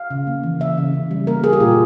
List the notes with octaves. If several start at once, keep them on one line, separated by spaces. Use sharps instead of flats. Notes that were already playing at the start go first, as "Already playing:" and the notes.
Already playing: F5
C#3
A#3
E3
C#3 E5
C#3
C#3
G3
A#3 A#4
G3 G#4
G4
A#2 F4